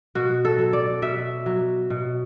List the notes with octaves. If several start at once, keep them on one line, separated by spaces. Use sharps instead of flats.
B2 F#4
A4
F#3
D5
B2 E5
F#3
B2